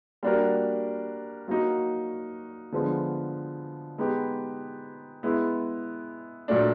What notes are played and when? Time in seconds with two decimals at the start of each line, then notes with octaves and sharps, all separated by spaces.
0.23 G3 A#3 D4 F#4 A#4
1.48 F#3 A#3 D#4 F#4
2.72 D3 F3 G#3 B3
3.98 G#3 B3 D#4 G4
5.23 G#3 B3 E4
6.48 A#2 F#3 A3 D4